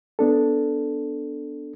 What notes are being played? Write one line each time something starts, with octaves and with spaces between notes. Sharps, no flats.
B3 D4 A4